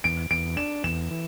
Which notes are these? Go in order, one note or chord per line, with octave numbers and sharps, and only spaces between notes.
E2 D7
E2 D7
D4 E7
E2 E7
E3